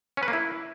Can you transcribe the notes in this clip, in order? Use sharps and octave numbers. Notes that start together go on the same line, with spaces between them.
C#4
B4
A#3
E4